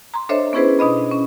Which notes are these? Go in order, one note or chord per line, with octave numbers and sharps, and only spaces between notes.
A#5 C6
D4 A4 C5 C#5 D#5 E5
B3 C#4 E4 G#4 B4 C5
B2 D4 D#5 B5
C#4